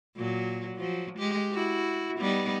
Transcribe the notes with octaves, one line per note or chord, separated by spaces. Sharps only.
A#2 F#3
F3 F#3
G#3 G4
E4 F#4
G3 B3 D#4